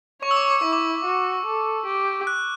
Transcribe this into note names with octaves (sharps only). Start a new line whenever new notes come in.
C#5 C#6
E6
D6
D6
E4 C#6
D6
F#4
A4
G4
F#6